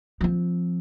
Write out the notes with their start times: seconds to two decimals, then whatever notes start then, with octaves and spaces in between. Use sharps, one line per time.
0.21 F3 C4